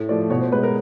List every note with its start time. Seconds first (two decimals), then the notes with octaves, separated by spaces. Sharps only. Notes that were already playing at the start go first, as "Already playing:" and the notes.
Already playing: A2
0.09 F3 A3 D5
0.30 B2 C#5
0.41 C5
0.52 G#3 B4
0.63 A#4